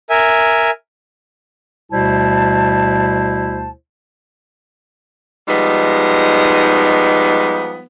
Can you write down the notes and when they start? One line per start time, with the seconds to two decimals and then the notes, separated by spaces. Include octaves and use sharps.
0.10 A#4 E5 G#5
1.91 D2 B2 G3 E4 C5 A5
5.48 F3 G3 G#3 B3 D#4